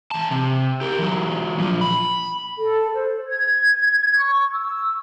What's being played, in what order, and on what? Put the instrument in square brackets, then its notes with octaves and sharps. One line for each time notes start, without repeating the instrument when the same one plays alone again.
[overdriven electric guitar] E3 A5
C3
G4 A#4
E3 F#3
A#2 F3
B5
[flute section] A4
C5
G#6
C#6
E6